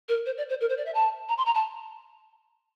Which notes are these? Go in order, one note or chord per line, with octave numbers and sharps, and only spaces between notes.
A#4
C5
D5
C5
A#4
C5
D5
E5
A5
A#5
C6
A#5
A5